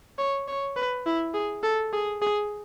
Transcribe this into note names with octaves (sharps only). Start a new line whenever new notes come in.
C#5
C#5
B4
E4
G#4
A4
G#4
G#4